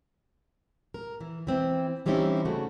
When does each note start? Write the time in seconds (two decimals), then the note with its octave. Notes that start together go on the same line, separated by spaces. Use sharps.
0.94 A#4
1.21 E3
1.47 E3 C4 E4
2.06 E3 G3 C4 C#4 D#4 E4
2.45 C#3 A3 F#4